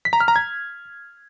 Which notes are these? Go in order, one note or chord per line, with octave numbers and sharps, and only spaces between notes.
B6
A#5
F6
A#5
G#6